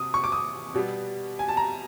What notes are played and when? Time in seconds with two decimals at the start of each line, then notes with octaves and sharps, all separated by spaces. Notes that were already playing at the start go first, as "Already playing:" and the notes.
Already playing: C3 D#6
0.14 C#6
0.24 D6
0.32 D#6
0.74 B2 G3 B3
1.39 G#5
1.48 A5
1.57 A#5